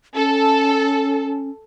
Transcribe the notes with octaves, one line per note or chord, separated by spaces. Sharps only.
C#4 A4